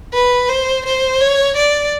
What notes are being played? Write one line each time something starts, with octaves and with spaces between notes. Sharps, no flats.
B4
C5
C5
C#5
D5